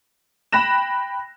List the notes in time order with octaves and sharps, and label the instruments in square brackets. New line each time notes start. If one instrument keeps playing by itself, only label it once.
[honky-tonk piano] G5 B5 F#6 A#6 E7